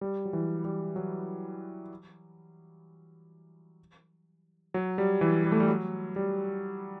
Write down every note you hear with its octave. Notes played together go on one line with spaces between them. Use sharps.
G3
F#3
E3
G3
F#3
F#3
G3
E3
G3
A3
G3
F#3
G3